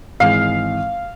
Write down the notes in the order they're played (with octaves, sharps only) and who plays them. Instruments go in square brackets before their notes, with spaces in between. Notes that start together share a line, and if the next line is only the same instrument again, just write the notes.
[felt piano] G#1 E3 G#3 [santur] F5